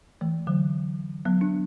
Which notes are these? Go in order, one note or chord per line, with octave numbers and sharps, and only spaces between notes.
E3 A3
D3 F#3
F#3 B3
D4